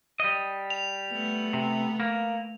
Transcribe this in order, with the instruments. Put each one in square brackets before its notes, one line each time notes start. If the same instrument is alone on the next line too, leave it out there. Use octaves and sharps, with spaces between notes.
[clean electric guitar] G3 D#5
[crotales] F7
[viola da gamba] A3 B3
[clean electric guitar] C3
A#3